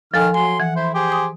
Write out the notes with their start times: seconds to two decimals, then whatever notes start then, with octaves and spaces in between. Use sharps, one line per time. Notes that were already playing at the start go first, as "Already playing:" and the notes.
0.14 D#3 F3 A4 G#5 F6
0.34 F#3 G#5 C6
0.60 E3 F#5
0.76 E4 C5
0.94 G4 G#4 C5
1.12 D#6